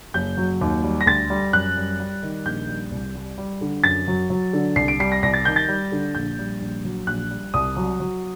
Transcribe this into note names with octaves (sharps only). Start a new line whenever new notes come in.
F#1 G6
F#3
D#2
G3
A#6
D2 A6
G3
F#2 F#6
G3
G3
D#3
A#1 G6
G3
C2
G3
G3
D3
F#2 A6
F#3
F#3
D3
C2 C7
D7
G3 C7
A#6
C2 A#6
A6
D#3 G6
A6
G3
D3
A#1 G6
G3
A#1
F#3
A#1 F#6
G3
C2 D#6
F#3
F#3